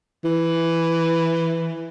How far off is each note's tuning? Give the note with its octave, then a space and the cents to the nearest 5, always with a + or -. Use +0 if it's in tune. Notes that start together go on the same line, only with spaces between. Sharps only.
E3 +5